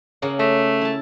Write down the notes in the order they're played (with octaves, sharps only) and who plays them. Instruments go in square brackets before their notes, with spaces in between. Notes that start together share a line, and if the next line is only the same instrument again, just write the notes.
[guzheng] C#3 A#3 F#5
[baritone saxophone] A3 [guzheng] A#5
[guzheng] E4 A5